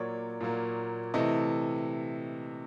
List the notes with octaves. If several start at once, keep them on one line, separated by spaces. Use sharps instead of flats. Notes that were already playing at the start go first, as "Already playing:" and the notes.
Already playing: A#2 F#3 A#3 C#5 D5
A#2 F#3 A#3
C3 E3 A3 D#5